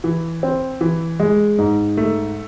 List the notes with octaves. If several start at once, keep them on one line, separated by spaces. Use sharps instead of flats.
E3
C4
E3
G#3
G#2
A3